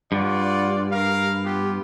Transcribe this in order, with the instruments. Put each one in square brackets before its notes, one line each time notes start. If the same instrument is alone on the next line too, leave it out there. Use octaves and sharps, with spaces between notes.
[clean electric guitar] G2 [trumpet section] F4 D5 F#5
[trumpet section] A#4 F5
B3 F4 G4